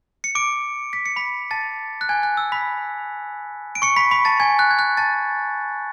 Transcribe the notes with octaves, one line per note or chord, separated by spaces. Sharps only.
C#7
D6 D7
B6
C#7
B5 B6
A5 A6
F#6
G#5 G#6
F#6
E6
B5 B6
D7
C#6 C#7
B5 B6
B5 B6
A5 A6
G#5 G#6
F#6
G#6
F#6
A5 A6